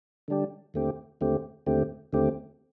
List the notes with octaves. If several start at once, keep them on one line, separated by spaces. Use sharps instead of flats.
D3 G3 D4 G4
D#2 D3 A3 C4 G4
D#2 D3 A3 C4 G4
D#2 D3 A3 C4 G4
D#2 D3 A3 C4 G4